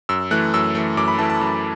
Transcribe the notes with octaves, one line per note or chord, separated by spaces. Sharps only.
F#2 E6
E3 A3 F#6
F#2 E6
E3 A3
F#2 D6
B5
E3 A3 A5
A5
F#2